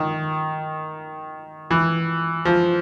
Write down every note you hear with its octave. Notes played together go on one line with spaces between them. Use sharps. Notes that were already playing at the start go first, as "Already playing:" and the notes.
Already playing: D#3
E3
F3